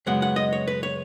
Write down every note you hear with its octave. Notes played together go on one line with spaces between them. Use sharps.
F#2 C#3 G#3 B3 F#5
F#5
D#5
C#5
B4
C#5